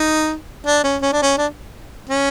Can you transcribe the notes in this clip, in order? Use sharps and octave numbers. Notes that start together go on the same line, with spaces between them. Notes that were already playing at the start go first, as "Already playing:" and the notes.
Already playing: D#4
D4
C#4
C#4
D4
C#4
D4
C#4